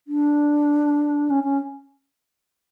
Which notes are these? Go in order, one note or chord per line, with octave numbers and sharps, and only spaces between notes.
D4
C#4
C#4